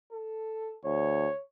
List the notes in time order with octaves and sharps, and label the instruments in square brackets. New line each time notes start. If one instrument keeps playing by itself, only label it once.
[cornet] A4
[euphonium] D2 [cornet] C#5